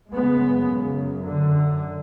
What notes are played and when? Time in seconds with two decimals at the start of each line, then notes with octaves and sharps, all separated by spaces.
0.12 F#2 C#3 G#3 B3
0.69 C#3
1.24 D3